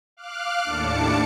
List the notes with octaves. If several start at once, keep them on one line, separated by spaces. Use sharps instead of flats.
F5 D6 F6 F#6
D#2 A2 D4 A5 D6 C#7